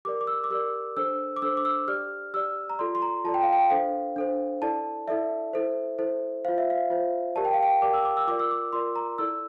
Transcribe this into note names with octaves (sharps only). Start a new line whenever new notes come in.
G4 A#4 D5 D6
D6
E6
D6
G4 A#4 D5 E6
D4 A4 C5 E6
D6
D4 A4 C5 E6
D6
E6
G4 D5 F6
G4 D5 E6
A#5
F4 A4 D5 C6
C6
A#5
F4 A4 D5 A5
G5
F5
G5
D4 A4 C5 F5
D4 A4 C5
E4 A4 D5 A5
E4 A4 D5 E5
E4 A4 C5
E4 A4 C5
F4 C5 F5
E5
F5
F4 C5
G4 A#4 D5 A5
G5
F5
G5
G4 A#4 D5 D6
E6
D6
E6
F4 A#4 D5 D6
E6
D6
F4 A#4 D5 C6
A#5
E4 A4 D5 E6